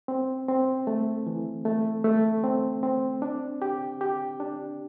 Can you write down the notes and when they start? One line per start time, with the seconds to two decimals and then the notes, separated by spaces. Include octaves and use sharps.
0.08 C4
0.48 C4
0.87 A3
1.27 E3
1.65 A3
2.04 A3
2.44 C4
2.83 C4
3.22 D4
3.62 G4
4.01 G4
4.40 D4